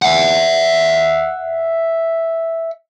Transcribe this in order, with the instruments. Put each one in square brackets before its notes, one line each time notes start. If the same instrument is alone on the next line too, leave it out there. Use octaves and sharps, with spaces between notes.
[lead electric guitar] E5 F#5